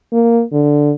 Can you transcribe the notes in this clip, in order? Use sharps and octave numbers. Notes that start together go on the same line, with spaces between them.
A#3
D3